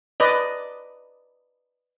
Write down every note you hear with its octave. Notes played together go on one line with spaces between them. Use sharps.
B4 D5 D#5